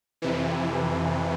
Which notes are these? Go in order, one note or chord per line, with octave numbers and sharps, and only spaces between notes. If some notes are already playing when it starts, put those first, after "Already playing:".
F2 C3 E3